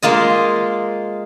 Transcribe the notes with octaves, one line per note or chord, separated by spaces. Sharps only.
G#3 A#3 F4 D#5